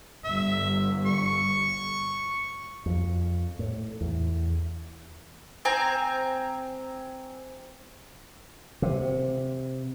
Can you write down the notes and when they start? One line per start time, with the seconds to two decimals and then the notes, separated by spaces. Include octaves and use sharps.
0.24 G1 E5
1.06 C#6
2.86 F2
3.59 A2
4.01 E2
5.65 C4 G#5 A#5
8.82 C3